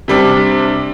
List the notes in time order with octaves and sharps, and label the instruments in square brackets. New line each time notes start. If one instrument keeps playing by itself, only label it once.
[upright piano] C3 G3 D4